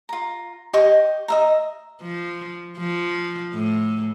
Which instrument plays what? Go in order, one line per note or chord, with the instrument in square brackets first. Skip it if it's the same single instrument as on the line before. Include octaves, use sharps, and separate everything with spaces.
[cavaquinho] F4 A#5
G4 D#5 C#6
D#5 E5 A#5
[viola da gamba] F3
F3
A2